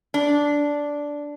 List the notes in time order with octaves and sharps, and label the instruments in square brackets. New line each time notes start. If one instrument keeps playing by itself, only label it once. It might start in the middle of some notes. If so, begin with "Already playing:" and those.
[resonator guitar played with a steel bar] D4